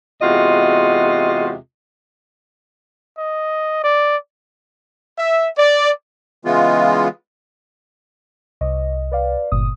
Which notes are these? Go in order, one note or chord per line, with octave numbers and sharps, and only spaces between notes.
E2 C3 G#3 F4 F#4 D#5
D#5
D5
E5
D5
C#3 E3 G#3 B3 F4
C2 D#5
B4 D5 F5
G1 A#2 D#6